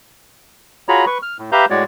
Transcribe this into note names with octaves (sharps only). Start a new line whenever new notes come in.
F4 F#4 G#4 C#5 A#5 B5
B4 C#6
F6
A2
G4 B4 E5 F5 A#5 G6
A2 G#3 F#4 C#5 D5